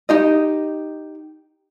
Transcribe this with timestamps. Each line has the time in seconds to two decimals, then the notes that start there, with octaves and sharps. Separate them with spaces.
0.09 D#4 G4 D#5